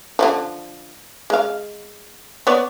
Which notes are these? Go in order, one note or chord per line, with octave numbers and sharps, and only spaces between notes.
D3 E3 F3
G#3 F5
B3 C#5 D5